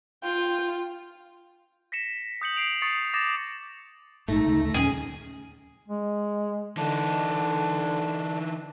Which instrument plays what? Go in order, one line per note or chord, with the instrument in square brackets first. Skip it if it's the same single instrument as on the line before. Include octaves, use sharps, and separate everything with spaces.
[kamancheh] F4 [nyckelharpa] G5
[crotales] A#6 B6 C#7 E7
D#6 G6 C#7 F#7
C7 D7 F7
C#6 D#6 A6 C#7
D6 D#6 A6 A#6 E7
[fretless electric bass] A#1 G#2 [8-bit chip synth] A3 A#6 [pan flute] D#4
[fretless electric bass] D2 C#3 G#3
[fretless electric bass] D#2 A#2 F#3 [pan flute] C#4 [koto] G#4 G#5
[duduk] G#3
[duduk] D3 [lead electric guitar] E3 D#4 [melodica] D4